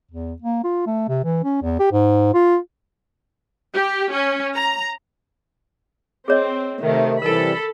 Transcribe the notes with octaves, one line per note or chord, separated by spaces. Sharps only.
E2
A#3
F4
A3
C3
E3
C#4
E2
G4
G#2
F4
G4
C#4
A#5
C4 G#4 C#5 D#5
C3 D#3 A3
C3 E3 G3 A4 A#4 G#5 B5